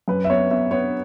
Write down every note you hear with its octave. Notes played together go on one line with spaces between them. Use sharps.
F#2 B4
E5
B3 C#5
B3 E5
B3 C#5